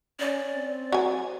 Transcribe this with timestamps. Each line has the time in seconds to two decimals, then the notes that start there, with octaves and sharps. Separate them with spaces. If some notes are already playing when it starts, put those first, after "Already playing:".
0.20 C#4 D5
0.54 C4
0.92 F#3 G#5